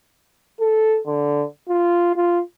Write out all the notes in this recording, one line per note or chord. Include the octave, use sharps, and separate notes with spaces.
A4
D3
F4
F4